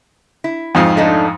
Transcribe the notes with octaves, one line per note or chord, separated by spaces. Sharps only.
E4
F2 G#2 F4
A3 D4 D#4